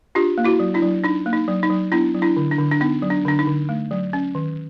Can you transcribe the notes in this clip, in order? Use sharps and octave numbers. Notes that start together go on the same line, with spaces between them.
D4 F4 G4
A#3
E4 F#4
F#3
D4 E4
F#3
D4 D#4
A#3
D#4
F#3
D#4
F#3
B3 D4 E4
F#3
D4 E4
D3
D4
D3
D4
B3 D#4
F#3
D4
D3 D4
D#4
D3
A3
F#3
C#4
D#3